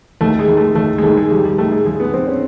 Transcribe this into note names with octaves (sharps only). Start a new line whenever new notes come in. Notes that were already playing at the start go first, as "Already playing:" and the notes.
D#2 A3
G#3
D#3
A3
D#2 A3
G#3
D#3 A3
G#3
D#2 G3
G3
D#3 A3
G#3
D#2 G#3
B3
D#3 C4
C#4